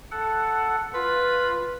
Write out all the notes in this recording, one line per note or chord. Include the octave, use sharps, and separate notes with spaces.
A4 F#5
F4 B4